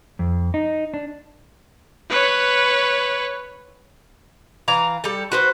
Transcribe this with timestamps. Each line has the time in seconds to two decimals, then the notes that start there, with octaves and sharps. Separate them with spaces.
0.19 F2
0.54 D#4
0.94 D4
2.10 B4 C#5
4.68 E3 F5 A#5
5.04 G3 A4
5.32 F#4 B4 C5